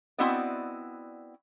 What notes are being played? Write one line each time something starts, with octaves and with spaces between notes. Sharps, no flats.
B3 C4 E4 F#4 D5 D#5